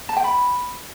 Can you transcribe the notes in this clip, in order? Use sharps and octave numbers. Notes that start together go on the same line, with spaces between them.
A5
G5
B5